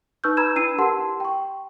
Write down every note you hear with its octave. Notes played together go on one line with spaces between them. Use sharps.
D#4 B4 C#6 E6 F6 G6
B4 A#5 B5 E6 G#6 E7
D4 E4 E6 C7 D#7
G4 A#4 F#5 A5 C6
G5 C#6